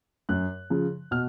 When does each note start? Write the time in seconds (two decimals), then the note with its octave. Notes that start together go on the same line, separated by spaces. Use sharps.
0.29 F#2 F#6
0.70 C#3 F3
1.11 B2 F6